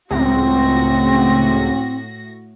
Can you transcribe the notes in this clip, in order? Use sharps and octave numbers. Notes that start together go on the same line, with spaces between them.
C#2 A2 C4 F#4 A#6